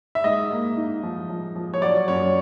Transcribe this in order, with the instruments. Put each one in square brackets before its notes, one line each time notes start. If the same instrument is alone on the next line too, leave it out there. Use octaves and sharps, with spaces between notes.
[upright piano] E5
G#2 D#5
A#3
D#4
F3
F3
F3
C#5
F#3 D5
F#2 C#5